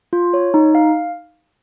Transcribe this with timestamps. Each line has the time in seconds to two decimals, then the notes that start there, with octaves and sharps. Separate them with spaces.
0.13 F4
0.34 C#5
0.54 D#4
0.75 F5